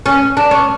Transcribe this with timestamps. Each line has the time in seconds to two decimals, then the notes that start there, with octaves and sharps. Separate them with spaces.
0.06 C#4
0.37 D4
0.51 C#4